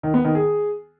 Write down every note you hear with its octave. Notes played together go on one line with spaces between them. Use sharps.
D#3
B3
D#3
G#4